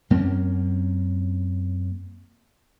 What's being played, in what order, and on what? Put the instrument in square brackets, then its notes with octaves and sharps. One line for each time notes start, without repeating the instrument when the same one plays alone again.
[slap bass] F#2 A#3 C4 C#4